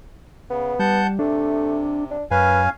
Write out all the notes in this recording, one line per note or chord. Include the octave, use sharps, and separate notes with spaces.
C#3 B3
G3 F#5 A5 G6
C3 A3 D4
D4
F#2 C#4 B4 F5 G#5